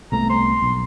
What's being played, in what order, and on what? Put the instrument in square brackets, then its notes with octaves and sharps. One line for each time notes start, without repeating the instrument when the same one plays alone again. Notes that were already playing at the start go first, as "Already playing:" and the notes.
[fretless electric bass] C2 A3 B3 [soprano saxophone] A#5
[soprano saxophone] C6
[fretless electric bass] B1